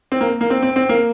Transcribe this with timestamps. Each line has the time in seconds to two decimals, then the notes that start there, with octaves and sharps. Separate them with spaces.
0.12 C4
0.21 A#3
0.41 A#3
0.50 C4
0.62 C4
0.76 C4
0.89 A#3